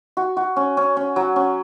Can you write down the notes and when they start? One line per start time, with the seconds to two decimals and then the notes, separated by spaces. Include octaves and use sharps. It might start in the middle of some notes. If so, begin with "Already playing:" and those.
0.17 F#4
0.37 F#4
0.56 C#4
0.77 C#4
0.97 C#4
1.16 F#3
1.36 C#4